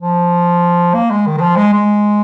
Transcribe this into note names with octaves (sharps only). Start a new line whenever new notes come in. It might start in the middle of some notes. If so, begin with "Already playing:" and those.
F3
A#3
G#3
D#3
D#3
F3
G#3
G#3